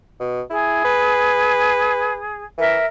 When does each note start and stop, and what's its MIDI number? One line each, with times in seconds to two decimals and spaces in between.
0.20 0.42 47
0.50 0.80 64
0.50 2.43 68
0.85 2.20 71
2.58 2.78 52
2.58 2.85 70
2.58 2.85 76